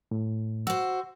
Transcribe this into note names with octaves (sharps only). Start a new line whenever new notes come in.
A2
F#4 C5 E6